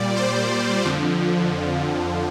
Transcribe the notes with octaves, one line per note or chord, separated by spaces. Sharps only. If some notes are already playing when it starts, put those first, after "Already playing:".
Already playing: A#2 G3 D5
C5
F2 D3 F3